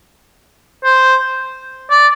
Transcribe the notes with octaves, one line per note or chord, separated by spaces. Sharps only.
C5
D5